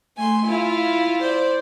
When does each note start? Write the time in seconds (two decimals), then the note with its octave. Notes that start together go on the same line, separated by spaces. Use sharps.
0.17 A3 G#5 C6
0.46 E4 F4 F5
1.21 C5 D5